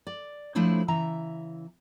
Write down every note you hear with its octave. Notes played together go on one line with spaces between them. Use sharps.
D5
F3 A3 D4 E4 C5 C#5
C#3 E3 E5 A#5